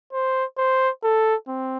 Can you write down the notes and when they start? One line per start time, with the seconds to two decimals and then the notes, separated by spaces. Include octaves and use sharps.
0.13 C5
0.58 C5
1.03 A4
1.48 C4